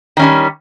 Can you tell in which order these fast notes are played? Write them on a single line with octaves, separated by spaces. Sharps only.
D#3 C#4 G3